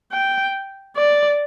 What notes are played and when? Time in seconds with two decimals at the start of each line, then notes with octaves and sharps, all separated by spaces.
0.13 G5
0.97 D5